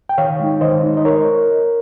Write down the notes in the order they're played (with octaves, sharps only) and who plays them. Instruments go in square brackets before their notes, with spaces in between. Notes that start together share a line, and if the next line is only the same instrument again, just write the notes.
[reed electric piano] G5
D#3 C#5 F5
G#3 D#4
D#3 C5 D#5
G#3 D#4
D#5
A#4 C#5